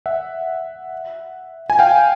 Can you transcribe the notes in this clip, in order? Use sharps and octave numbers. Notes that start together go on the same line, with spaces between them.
E5 F#5
G#5
F5 G5